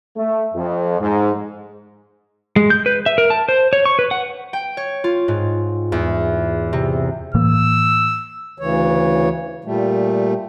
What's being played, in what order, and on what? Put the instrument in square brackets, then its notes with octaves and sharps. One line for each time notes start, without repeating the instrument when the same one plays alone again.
[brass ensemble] A3
F2
G#2
[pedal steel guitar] G#3
G6
B4
E5
A#4
A5
C5
C#5
C#6
B4
F#5
[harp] G5
C#5
F4
G#2
E2
C3
[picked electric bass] A2 E3 A#3 [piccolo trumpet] E6
[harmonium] D2 C#3 E3 C#5
A#2 G3 A3